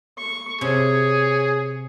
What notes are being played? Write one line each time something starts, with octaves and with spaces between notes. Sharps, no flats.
C#6
C3 G#4 C#5